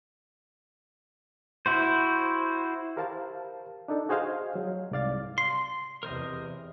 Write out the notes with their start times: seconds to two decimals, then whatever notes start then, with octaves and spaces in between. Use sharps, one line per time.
1.66 E4 F#4 C5
2.97 G4 A#4 C5 F5 A5
3.88 D4 D#4 A4
4.09 F#4 G#4 C5 D#5 F5 G#5
4.55 F#3
4.91 C2 G#2 D5 F5 A6
5.38 C6 C7
6.03 E2 C3 A#4 C5 D#5